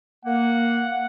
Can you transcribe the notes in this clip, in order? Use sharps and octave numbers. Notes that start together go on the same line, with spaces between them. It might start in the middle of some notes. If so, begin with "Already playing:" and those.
A#3 F#5